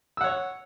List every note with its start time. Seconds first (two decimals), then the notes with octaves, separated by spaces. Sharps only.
0.17 E6
0.21 F#5
0.24 C#5